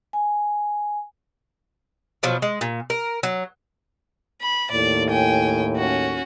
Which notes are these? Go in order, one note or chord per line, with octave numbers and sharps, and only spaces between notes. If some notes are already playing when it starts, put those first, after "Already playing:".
G#5
B2 F3 F#3
G#3
A#2
A#4
F#3
B5
D#2 A2 D5
G5 G#5
C#4 F#4